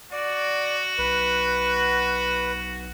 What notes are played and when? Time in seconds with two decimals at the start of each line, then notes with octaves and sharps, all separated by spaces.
0.12 F#4 D5
0.98 B1 B4